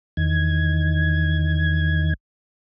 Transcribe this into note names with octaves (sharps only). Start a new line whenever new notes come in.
E2 D#3 G#6